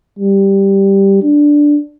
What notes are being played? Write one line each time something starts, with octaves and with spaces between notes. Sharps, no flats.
G3
D4